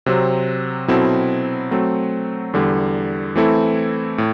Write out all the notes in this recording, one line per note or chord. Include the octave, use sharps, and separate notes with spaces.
C3 F#3 C4
B2 F#3 C4 E4 A4
F#3 A3 C4
E2 D3 G3
E3 A3 C4 E4 A4
A2